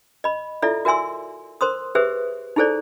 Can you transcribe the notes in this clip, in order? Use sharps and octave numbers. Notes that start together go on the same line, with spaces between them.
D#5 B5
E4 F4 A4 D5 E5
F#4 A#4 E5 G#5 C6 E6
A#4 C5 C6 D#6
G4 G#4 B4 C5 E5 D#6
D#4 E4 G#4 A4 C5 D5